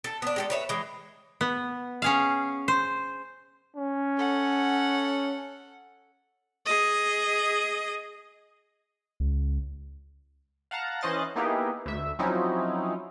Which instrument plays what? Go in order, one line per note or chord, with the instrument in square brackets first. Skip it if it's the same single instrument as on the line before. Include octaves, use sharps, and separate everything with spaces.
[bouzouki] A4
B3 D4
G#3 G4 A4
B4 C#5 E5
E3 G#3
[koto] B3
C#4 G#4 F5
C5
[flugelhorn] C#4
[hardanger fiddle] A4 F#5
[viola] G#4 D#5
[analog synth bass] C#2
[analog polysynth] F5 F#5 A5 A#5
E3 C#4 C5 D#5 F#6 A6
A#3 B3 D#4 E4 G4 G#4
D2 E5
F3 F#3 C4 C#4 D#4 E4